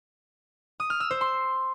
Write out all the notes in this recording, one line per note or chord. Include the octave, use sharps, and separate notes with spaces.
D#6
F6
E6
C5
C6